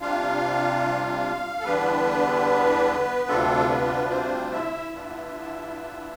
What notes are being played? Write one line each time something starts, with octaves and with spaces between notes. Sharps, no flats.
C3 G3 D4 F4 F5
A4
E2 D3 G3 B3 D4 B4
D2 C3 G3 D4 F4 A4
B3 B4
C4 C5
E4 E5
G2 E3 B3 D4 F4